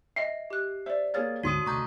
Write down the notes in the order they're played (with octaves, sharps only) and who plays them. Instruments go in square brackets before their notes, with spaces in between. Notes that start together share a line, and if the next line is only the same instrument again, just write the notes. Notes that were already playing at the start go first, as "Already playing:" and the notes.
[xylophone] D#5 E5 [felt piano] C7
[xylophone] G4 F#6
[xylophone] C5 D5 [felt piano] E5
[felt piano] A#3 G#4 F5 [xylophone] C#5 F6 A6
[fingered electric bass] D2 G#2 [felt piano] D3 D#7 [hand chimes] F#4 C6 D#6
[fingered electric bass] D#1 B1 C3 [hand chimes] A3 A#5 G6 [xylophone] C#6